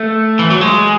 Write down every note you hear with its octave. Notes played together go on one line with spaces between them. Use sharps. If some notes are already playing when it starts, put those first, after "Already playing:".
Already playing: A3
E3
F#3
G#3